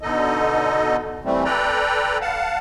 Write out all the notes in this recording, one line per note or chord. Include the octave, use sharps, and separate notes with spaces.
B2 D3 D#4 A4 D#5
E3 G3 A3 C4
A4 B4 D5 G5 A#5
F5 F#5 A5